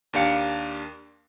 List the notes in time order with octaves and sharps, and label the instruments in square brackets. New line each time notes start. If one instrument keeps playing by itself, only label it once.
[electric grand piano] D#2 A#3 D4 G4 F5 C#7